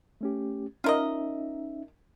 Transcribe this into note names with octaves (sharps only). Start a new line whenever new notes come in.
A3 C#4 G4
C#4 D#4 F4 A#4 D#5 E5